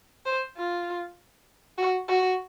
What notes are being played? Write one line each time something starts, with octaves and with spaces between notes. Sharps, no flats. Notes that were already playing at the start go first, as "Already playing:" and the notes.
C5
F4
F#4
F#4